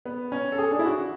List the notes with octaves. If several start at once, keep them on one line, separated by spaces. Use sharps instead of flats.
B3
C#4
A4
G#4
D4
E4
F#4